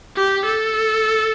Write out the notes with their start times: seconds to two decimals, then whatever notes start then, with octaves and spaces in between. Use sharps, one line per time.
0.17 G4
0.46 A4